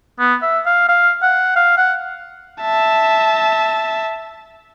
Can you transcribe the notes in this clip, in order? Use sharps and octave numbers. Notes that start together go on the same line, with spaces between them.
B3
E5
F5
F5
F#5
F5
F#5
E5 A5